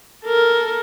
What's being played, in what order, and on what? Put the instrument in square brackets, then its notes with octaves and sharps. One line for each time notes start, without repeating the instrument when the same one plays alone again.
[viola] A4 A#4